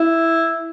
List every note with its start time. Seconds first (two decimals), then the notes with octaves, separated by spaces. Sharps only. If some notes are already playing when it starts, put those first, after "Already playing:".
Already playing: E4